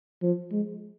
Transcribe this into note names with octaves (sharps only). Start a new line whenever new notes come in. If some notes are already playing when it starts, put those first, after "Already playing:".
F3
G#3